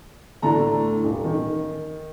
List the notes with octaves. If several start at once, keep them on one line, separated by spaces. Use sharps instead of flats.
A2 D3 A3 A#5
D#1
D#3